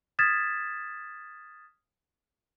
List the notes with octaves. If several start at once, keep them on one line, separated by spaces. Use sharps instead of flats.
D#6 F6 G#6 A6 B6 E7